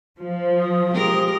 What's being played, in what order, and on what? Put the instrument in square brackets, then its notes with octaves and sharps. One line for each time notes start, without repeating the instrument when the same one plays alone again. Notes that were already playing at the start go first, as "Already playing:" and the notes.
[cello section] F3
[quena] D#6
[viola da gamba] G#3 G4 A#4